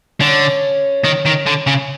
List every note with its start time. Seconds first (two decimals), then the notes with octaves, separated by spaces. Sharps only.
0.20 D3 C#4
1.04 D#3
1.25 D#3
1.46 D3
1.67 C#3